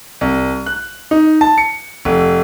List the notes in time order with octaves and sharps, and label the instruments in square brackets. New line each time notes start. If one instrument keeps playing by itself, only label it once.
[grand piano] C2
F#6
D#4
A5
C#7
F1